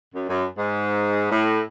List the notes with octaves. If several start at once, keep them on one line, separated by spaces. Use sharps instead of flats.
F#2
F#2
G#2
A2